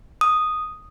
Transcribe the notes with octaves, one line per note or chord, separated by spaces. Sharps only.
D#6